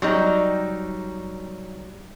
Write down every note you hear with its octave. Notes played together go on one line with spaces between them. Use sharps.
F#3 G3 D#4